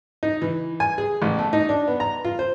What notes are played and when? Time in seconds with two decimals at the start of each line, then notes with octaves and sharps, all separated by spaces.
0.23 D#4
0.42 E3
0.80 G#5
0.98 G#4
1.22 A1
1.39 A3
1.53 D#4
1.69 D4
1.88 B3
2.00 A#5
2.25 F4
2.39 C5